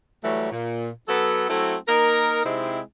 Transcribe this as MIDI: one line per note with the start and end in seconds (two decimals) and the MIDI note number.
0.23 0.49 52
0.23 0.49 54
0.23 0.49 55
0.23 0.49 57
0.51 0.89 46
1.08 1.46 54
1.08 1.46 59
1.08 1.46 69
1.48 1.75 54
1.48 1.75 57
1.48 1.75 60
1.48 1.75 64
1.48 1.75 69
1.88 2.41 58
1.88 2.41 63
1.88 2.41 70
2.45 2.79 48
2.45 2.79 56
2.45 2.79 60
2.45 2.79 63
2.45 2.79 64